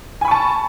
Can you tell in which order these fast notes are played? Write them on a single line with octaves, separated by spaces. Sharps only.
G#5 B5 C#6 A5